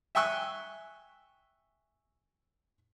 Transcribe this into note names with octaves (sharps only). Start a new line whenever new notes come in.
E5 G5 G#5 C#6 E6 F#6